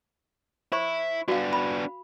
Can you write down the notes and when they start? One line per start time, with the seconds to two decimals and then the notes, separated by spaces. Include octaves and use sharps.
0.72 E4 C5 C#6
1.28 B3 D4 F#4 F5
1.53 B5